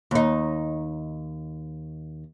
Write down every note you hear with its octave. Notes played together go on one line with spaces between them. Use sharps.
D#2 D#4